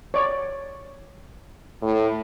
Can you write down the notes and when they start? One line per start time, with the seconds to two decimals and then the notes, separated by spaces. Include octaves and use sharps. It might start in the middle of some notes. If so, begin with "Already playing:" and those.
0.14 C#5 D5
1.82 A2